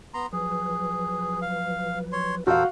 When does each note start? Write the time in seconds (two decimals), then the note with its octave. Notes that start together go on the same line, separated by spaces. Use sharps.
0.14 B3 A#5 C6
0.33 F3 F#3 G#4 B4
1.42 F5
2.12 C#5 C6
2.47 E2 A#2 E3 F#4 A4 A#4 C5 F5